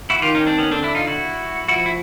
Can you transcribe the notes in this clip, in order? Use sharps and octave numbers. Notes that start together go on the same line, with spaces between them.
E4 F#4
D#3 F4 G4
C#4 D#4
C4 D4
B3 C#4
D3 C4 D4
D4 E4
D#4 F4
E4 F#4
F3 E4 F#4
E4